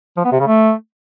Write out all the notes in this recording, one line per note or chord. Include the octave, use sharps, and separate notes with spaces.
F3
B3
C3
C#3
A3